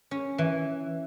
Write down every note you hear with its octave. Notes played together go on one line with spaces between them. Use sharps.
C#4
E3